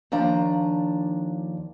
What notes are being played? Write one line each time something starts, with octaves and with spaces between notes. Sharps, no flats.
D#2 F3 D4 A#5